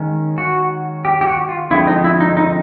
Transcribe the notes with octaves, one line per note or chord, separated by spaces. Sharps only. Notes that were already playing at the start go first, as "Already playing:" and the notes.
Already playing: D#3 G#3 C#4
F#4
G4
G4
F#4
F4
D3 F3 G#3 C4 E4
D#4
E4
D#4
D#4